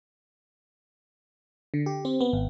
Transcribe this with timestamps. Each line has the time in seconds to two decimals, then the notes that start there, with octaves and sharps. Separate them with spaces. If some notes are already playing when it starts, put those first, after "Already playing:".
1.74 D3
1.86 G4
2.05 C4
2.21 B3
2.33 G#1